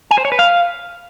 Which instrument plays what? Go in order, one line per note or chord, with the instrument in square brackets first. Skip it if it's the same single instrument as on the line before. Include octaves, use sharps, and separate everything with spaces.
[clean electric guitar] G#5
C5
C#5
B4
F5